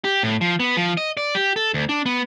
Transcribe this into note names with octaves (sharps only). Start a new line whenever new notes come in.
G4
A2
F3
B3
F3
D#5
D5
G4
A4
D2
D4
B3